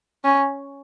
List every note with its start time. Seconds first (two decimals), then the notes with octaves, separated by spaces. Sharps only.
0.24 C#4